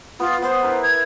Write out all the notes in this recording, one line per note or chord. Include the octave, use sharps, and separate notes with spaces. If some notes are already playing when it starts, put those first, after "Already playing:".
B3 F4
B3 C5
E4 A#4 B4
G#6